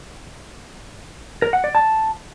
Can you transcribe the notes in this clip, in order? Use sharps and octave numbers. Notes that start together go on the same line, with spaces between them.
A#4
F#5
D5
A5